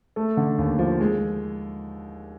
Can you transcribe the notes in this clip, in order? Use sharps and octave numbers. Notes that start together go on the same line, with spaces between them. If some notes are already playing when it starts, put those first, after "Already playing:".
A3 A4
D3
D#2
F3
G#3